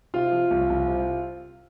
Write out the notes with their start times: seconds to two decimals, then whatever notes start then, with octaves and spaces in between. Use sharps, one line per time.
0.14 C3 F4
0.31 F3
0.51 C2
0.69 C2
0.88 C3